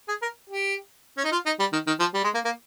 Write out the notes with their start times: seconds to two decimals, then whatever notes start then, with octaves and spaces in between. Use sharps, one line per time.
0.08 G#4
0.22 A#4
0.50 G4
1.18 C#4
1.24 D#4
1.32 F4
1.46 D#4
1.60 G3
1.73 D#3
1.87 D#3
2.00 F3
2.14 G3
2.24 G#3
2.34 A#3
2.45 A#3